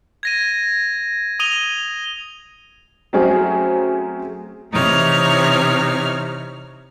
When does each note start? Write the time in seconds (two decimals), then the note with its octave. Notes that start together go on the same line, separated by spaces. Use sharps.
0.23 G#6 A#6 D#7
1.40 D#6 D#7 F7 G7
3.13 F#3 A3 C4 C#4 G#4
4.72 C3 E3 D#4 C#5 F6